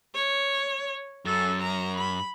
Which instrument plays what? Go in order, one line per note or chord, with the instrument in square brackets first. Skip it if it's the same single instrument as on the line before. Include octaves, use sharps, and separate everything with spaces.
[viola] C#5
[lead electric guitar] F#2 [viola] A4
[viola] A#5
B5